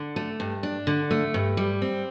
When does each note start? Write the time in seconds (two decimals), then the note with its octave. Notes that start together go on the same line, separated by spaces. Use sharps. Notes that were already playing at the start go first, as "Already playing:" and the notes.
Already playing: D3
0.16 A3
0.40 G2
0.63 D4
0.87 D3
1.11 A3
1.34 G2
1.57 G3
1.82 C4